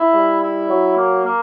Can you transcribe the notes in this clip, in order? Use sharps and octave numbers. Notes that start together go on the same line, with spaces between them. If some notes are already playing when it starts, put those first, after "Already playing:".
Already playing: E4
G3
E4
F#3
A#3
A#3